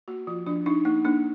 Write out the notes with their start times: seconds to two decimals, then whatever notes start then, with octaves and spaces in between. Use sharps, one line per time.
0.08 A#3 F#4
0.27 F3 F4
0.46 F3 D4
0.66 D4 D#4
0.85 A#3 D#4
1.05 A#3 D4